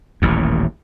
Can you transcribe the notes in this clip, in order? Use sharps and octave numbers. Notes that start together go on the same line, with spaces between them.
D#1 A1 D#2